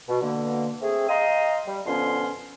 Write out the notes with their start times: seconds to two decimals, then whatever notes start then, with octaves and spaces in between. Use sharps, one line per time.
0.09 B2
0.22 B2 D3 A#3
0.81 A3 C4 G#4
1.09 D#5 F5 G5 A#5 C6 D#6
1.67 G3
1.85 F2 B2 D3 B3 C#4 C6